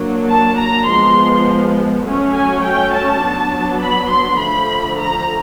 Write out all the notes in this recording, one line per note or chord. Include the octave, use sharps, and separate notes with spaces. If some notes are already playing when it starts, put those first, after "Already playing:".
Already playing: F#3 A#3 D4
A5
A#5
F3 G#3 B3 C6
F#3 A3 C#4
G#5
G5
A5
F#3 B3 D4
B5
C6
D3 F3 A3 B5
A#5